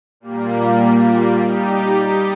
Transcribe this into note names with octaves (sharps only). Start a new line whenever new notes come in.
A#2 G3 A#3
G3 D#4 G4